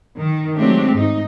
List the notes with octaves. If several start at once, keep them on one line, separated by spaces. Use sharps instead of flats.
D#3
F#3 G#3 A3 C4 D4 G4
G#2 D#4